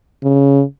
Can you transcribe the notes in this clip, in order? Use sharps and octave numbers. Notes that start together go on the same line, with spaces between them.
C#3